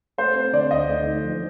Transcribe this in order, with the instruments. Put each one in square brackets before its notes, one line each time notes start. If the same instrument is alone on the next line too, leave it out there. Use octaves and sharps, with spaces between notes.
[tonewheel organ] A3 [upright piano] C5
[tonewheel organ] C4
[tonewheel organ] D3 [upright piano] D5
[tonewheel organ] D2 [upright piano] D#5
[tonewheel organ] A3
D#4
F3